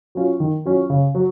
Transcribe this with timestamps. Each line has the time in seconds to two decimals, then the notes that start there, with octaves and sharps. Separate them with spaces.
0.15 F#3 C#4 F4
0.40 D#3
0.65 F#3 C#4 F4
0.90 C#3
1.15 F#3